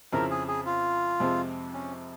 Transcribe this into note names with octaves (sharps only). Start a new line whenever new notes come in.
F2 C#3 F3 C4 E4 A#4
G#4
G#4
F4
F2 C3 F3 G#3 C4
C#4